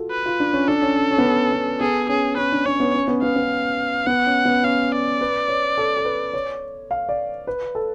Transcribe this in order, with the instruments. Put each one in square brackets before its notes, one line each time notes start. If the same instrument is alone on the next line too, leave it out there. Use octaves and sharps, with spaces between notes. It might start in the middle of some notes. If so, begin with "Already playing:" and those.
Already playing: [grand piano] F4 F#4 A4
[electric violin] B4
[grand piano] F4
D4
C#4
[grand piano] D4 [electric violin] A4
[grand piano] C#4
C#4
C#4
B3
C#4
B3
[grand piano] B3 [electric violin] G#4
[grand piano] C#4 [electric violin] G#4
[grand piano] C#4 [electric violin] B4
[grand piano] D4
[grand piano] C#4 [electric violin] C#5
[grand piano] B3
C#4
B3
[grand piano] B3 [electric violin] F5
[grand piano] B3
[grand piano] B3 [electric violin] F#5
[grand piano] C#4
B3
[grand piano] C#4 [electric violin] F5
[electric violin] D5
[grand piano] B4
C#5
A4
A4
B4
C#5
F5
D5
B4
A4